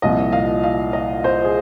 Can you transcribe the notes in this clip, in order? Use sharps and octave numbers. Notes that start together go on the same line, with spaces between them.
C2 A#2 F3 D#5
F5
F5
D#5
C5
G#4